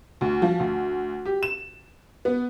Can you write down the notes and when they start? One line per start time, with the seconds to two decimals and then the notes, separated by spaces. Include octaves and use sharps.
0.21 D2
0.42 F3
0.60 D2
1.26 G4
1.43 E7
2.25 B3